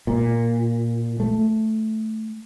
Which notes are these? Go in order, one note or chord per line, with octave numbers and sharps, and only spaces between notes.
A#2
A3